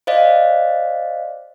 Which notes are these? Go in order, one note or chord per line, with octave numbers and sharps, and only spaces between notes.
C5 D5 D#5 F5